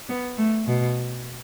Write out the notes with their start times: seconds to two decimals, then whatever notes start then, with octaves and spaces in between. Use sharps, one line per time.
0.09 B3
0.38 A3
0.66 B2